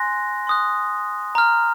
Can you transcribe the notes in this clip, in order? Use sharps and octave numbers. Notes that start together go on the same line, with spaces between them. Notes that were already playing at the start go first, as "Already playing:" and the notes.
Already playing: G#5 C6 F#6 A#6
C6 D#6 F#6
A#5 F6